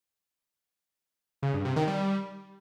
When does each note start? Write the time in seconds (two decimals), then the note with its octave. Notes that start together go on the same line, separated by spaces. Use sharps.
1.43 C#3
1.54 G2
1.65 C3
1.76 D#3
1.87 G3